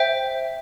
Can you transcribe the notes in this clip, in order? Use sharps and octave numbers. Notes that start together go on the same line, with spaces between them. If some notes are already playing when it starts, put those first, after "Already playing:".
Already playing: C5 E5 G5